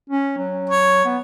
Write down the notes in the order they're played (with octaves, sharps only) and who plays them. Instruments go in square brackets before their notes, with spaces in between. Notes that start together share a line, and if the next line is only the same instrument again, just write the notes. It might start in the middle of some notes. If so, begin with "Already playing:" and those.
[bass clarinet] C#4
F#3
[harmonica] C#5
[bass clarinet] B3